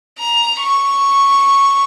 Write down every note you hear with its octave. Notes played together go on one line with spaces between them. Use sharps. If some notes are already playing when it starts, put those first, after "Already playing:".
A#5
C#6